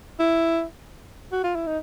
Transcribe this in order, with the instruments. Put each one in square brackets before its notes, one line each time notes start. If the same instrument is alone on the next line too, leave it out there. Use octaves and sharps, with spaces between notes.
[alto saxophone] E4
F#4
F4
E4
D#4